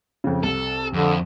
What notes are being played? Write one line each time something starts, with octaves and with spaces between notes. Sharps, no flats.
F2 C#3
C2 A4
F2 D3